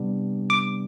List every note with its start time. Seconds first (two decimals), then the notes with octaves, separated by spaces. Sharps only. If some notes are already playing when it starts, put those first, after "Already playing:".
Already playing: C3 G3 B3 D4
0.50 D6